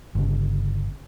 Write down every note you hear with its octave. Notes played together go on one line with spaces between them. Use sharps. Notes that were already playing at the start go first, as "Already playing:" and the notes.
G1 C#3